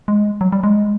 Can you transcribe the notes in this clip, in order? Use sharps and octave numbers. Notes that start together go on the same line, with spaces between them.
G#3
F#3
G3
G#3